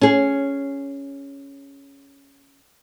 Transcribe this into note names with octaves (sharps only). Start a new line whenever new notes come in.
C#4 G#4